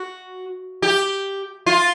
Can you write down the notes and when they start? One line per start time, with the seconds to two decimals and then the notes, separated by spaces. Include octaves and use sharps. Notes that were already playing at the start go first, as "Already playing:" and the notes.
Already playing: F#4
0.82 G4
1.66 F4